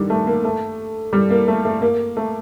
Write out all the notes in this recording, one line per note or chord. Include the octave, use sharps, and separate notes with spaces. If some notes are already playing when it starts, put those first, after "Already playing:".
Already playing: D3 D#3 G3
A3
A#3
A3
G3
A#3
A3
A3
A#3
A3